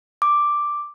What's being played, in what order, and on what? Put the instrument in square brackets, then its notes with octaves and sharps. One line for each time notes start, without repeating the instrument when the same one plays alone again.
[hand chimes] D6